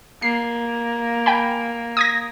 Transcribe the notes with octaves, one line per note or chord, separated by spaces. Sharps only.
A#3 C7
G5 G#5 B5
D#6 G#6 A#6